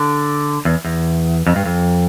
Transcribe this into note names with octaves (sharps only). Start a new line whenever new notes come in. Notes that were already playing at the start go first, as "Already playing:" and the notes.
Already playing: D3
E2
E2
F2
G2
F2